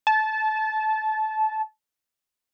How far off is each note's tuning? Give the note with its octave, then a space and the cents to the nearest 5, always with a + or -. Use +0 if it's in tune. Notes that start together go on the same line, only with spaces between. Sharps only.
A5 -20